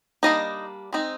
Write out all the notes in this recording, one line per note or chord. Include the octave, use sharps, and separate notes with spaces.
G3 A#3 D4 D#4 D#5
G#3 C4 D#4